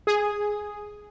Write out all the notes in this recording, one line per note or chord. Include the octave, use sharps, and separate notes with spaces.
G#4